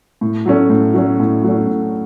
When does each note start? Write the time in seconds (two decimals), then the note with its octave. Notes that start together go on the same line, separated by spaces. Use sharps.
0.21 A2
0.46 F#3 A3 C#4
0.70 A2
0.94 F#3 A3 C#4
1.19 A2
1.44 F#3 A3 C#4
1.67 A2